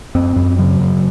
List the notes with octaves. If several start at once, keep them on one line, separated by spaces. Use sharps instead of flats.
F#2 C4
F#2
C#3 F#3
F#2